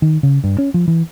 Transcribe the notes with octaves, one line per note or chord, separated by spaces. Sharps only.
D#3
C#3
G2
C#4
F3
E3